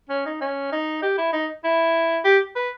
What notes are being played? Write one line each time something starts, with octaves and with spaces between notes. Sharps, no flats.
C#4
D#4
C#4
D#4
G4
E4
D#4
E4
G4
B4